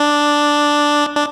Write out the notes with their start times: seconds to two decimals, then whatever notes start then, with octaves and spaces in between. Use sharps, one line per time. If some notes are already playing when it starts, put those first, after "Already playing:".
Already playing: D4
1.16 D4